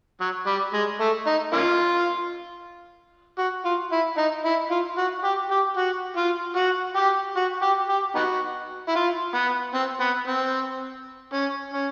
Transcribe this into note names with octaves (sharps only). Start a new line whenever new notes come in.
F#3
G3
G#3
A3
D#4
A#3 C#4 F4
F#4
F4
E4
D#4
E4
F4
F#4
G4
G4
F#4
F4
F#4
G4
F#4
G4
G4
B3 D#4 F#4
E4
F4
B3
C4
B3
C4
C#4
C#4